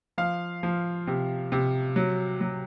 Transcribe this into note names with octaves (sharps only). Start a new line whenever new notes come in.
F3 F5
F3
C3
C3
F#3
F#3